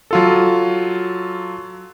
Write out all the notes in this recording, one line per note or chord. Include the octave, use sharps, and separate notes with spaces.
F#3 F4 A4